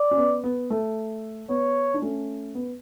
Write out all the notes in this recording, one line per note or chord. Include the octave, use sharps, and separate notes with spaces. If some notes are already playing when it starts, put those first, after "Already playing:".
Already playing: D5
C#4
B3
B3
A3
B3 C#5
D4
A3 C#4
B3